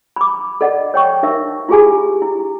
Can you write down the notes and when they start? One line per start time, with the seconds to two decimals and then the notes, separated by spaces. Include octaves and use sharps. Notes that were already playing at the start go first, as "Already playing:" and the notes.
0.16 B5 D6
0.61 A4 D5 D#5 F#5
0.94 C#5 G5 C#6
1.23 D#4 A#4 E5
1.69 E4 F4 G4 G#4 G#5
2.22 E4